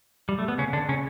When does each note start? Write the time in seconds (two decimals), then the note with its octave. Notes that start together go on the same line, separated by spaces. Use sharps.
0.29 G3
0.39 A3
0.48 B3
0.58 C#3 C#4
0.73 D3 D4
0.89 C#3 C#4